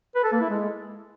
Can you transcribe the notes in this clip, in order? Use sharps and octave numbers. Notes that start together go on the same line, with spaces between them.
B4
A4
A#3
E4
G#3